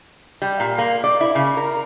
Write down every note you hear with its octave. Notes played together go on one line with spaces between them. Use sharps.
G3
A#2
A#3
D5
E4
C#3
A#4